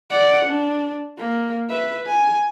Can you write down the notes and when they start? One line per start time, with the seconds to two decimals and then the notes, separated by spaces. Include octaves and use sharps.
0.10 D5 F#5
0.46 D4
1.18 A#3
1.70 B4 E5
2.07 G#5